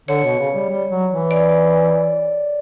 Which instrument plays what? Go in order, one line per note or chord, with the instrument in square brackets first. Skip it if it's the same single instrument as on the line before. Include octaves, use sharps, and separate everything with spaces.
[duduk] D3 [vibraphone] C#5
[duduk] B2
C#3
G3
G3
F#3
E3
[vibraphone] D5